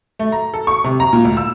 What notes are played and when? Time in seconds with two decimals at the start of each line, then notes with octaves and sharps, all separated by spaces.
0.19 A3
0.32 A#5
0.54 A4
0.67 C#6
0.84 C3
1.00 A#5
1.13 A#2
1.25 D2
1.37 E6